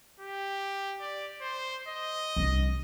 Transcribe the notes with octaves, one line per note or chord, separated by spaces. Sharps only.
G4
D5
C5
D#5
C2 D4